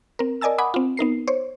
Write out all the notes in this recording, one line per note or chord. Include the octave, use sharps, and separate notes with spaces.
C4 A#4
A#4 D5 D#5 G#5 A5 E6
F#5 G#5 B5 D6 D#6
C4 F4
B3 D#4 A#4 C7
C5 C#5